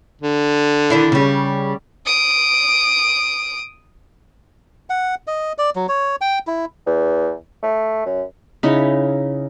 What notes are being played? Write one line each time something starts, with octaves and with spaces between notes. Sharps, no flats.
D3
D#3 D4 E4
C#3 G3
D#6 D7
F#5
D#5
D5
F#3
C#5
G5
E4
E2
A3
F#2
C#3 D#4 E4 C#5